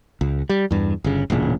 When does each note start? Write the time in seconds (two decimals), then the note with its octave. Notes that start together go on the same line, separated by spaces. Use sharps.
0.21 C#2
0.49 G3
0.71 E2 G2
1.04 G1 C#3
1.30 E1 A1 A#2 C#3